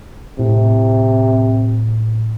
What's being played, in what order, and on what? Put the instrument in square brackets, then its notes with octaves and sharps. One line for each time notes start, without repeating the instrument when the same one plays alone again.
[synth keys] A2 [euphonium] C3